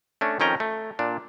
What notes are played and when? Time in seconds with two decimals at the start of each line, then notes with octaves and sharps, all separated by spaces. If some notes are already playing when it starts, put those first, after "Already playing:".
0.21 A3 C#4 D4
0.40 F2 D#3 C#4 G5 A#5
0.60 A3
0.99 A#2 D4